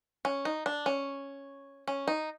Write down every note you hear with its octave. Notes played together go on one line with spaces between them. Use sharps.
C#4
D#4
D4
C#4
C#4
D#4